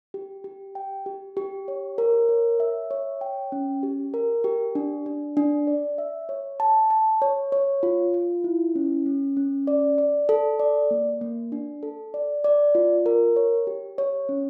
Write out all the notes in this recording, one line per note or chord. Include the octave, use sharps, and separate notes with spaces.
G4
G4
G5
G4
G4
C#5
A#4
C#5
E5
C#5
G5
C#4
G4
A#4
G4
D4
D4
D4
D5
E5
C#5
A5
A5
C#5
C#5
F4
F4
E4
C#4
C#4
C#4
D5
D5
A4
D5
A#3
A#3
D4
A4
D5
D5
F4
A#4
C#5
G4
C#5
C#4